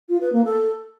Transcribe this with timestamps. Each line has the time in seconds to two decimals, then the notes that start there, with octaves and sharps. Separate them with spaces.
0.09 F4
0.21 B4
0.33 A#3
0.44 A4